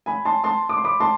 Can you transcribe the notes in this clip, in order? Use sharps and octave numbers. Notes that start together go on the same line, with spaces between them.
G#5 B5
A5 C6
A5 C6
D6
C6
B5 D6
A5 C6